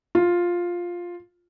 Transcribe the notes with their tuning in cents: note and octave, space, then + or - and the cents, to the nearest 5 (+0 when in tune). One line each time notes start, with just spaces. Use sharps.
F4 +5